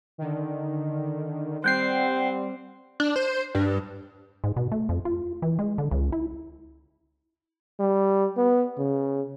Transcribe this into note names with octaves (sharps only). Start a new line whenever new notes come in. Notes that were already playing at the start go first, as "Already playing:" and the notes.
D3 D#3
G3 C4 F#5 G5 C7
D4
C5
G2
G#2
B2
A3
F2
F4
E3
G#3
D3
C#2
E4
G3
B3
C#3